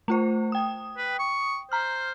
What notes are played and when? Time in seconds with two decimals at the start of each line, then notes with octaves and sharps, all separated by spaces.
0.08 A3 F4 C5
0.52 G5 D#6
0.97 B4
1.19 C#6
1.72 C5 A#5 F6